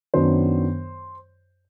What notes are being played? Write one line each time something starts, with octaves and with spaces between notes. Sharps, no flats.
F#2 D#3 F#3 B3 D4 C5